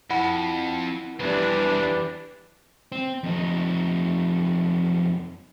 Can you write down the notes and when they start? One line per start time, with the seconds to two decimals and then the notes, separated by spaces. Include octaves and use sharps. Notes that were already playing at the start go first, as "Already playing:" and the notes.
0.10 F2 E4 F#5 B5
1.20 E2 E3 F3 G3 D4 B4
2.92 C4
3.24 F2 D#4